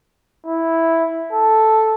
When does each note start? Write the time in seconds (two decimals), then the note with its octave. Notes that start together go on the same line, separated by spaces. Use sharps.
0.46 E4
1.32 A4